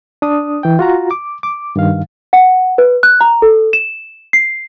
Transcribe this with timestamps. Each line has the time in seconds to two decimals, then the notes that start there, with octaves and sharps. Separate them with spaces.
0.22 D4 D#6
0.63 E3 G5
0.79 F4 F#4 A#5
1.11 D6
1.43 D6
1.76 G2 D#3 F5
2.33 F#5
2.78 B4
3.03 F#6
3.21 A#5
3.42 A4
3.73 E7
4.33 C7